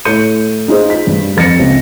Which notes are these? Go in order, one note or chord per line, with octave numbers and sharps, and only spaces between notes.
A2 A3 C#5 G6 C#7 D#7
D#4 F4 G#4 C5
B6
G2 G3
F2 A6 A#6 C#7
C#2 C4